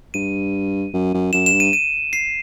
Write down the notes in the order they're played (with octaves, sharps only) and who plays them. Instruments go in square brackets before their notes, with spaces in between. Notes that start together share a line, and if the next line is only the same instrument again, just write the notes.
[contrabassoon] G2 [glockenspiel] D#7
[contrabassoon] F#2
F#2
[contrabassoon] F#2 [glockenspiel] E7
[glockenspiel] E7
[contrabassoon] G2
[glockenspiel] D#7
D#7
C7